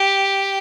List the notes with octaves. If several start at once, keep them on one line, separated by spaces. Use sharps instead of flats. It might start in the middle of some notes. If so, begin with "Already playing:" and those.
Already playing: G4